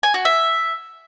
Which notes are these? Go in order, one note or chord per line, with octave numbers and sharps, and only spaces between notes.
G#5
F#4
E5